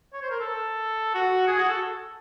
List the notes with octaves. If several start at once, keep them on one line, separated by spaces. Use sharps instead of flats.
C#5
C5
A#4
A4
F#4
G#4
F#4
A4